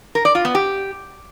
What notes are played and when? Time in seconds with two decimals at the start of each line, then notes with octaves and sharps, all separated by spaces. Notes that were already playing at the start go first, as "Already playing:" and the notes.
0.15 A#4
0.25 D5
0.35 F4
0.45 B3
0.55 G4